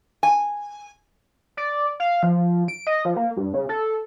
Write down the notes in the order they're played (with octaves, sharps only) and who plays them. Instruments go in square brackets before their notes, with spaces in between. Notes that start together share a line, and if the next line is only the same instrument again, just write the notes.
[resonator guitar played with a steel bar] G#5
[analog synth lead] D5
F5
F3
D7
D#5
F3
A#3
G2
C#3
A4